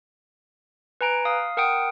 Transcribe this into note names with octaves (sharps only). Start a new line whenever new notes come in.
B4 G#5 A#5 D7
F5 D#6
A#4 F#5 G5 D#6 D7